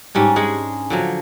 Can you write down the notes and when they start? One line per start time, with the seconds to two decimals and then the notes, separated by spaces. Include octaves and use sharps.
0.15 G#2 G3 C#4 D4
0.36 G#3 G#4 F#5
0.90 D3 F3 F#3